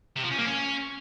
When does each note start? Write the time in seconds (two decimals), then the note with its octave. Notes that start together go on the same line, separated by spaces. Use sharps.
0.16 C3
0.23 F3
0.31 C#4
0.38 A#3
0.45 C#4